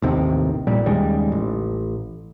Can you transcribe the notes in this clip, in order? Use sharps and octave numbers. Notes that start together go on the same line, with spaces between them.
A1 D#2 C3 D#3
A#1 A#2 G3
D#2 C#3 G3 G#3
A1